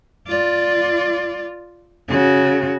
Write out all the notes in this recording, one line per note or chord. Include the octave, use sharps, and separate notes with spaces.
F4 D5
C#3 F#4